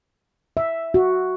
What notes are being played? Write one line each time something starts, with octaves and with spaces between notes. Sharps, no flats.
E5
F#4